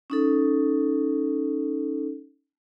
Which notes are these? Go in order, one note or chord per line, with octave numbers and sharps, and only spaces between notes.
C#4 D#4 A4